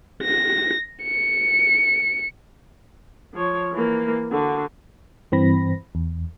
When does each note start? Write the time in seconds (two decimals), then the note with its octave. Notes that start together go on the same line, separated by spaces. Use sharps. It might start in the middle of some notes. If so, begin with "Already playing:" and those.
0.22 A#6
1.03 C#7
3.34 F3 C#5
3.73 E3 A#3
4.30 D3 F#4
5.32 G2 E3 C4 B5 A#6
5.95 E2